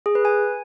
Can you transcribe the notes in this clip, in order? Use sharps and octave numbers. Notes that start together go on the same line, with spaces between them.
G#4
B4
G#5